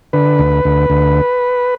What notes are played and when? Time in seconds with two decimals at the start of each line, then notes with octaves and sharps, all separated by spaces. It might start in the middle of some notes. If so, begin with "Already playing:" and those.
0.13 D3 B4
0.39 D2
0.65 D2
0.90 D2